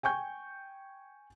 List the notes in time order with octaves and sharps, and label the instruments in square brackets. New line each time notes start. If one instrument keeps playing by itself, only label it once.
[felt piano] G5 G#5 C#6 G6